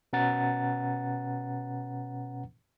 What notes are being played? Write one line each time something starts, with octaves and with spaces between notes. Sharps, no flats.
B2 C#4 B4 F#5 A#5 A6